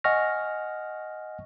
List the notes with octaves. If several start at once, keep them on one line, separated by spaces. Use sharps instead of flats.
D#5 F#5 G#5 C#6 F6 A#6